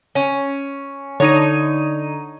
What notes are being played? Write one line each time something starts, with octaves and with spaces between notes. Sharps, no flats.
C#4
D3 D#4 C#5 D#7